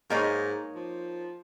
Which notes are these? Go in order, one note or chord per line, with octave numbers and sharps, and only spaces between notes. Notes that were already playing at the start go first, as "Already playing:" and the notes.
G#2 A#3 D#4 C#5
F3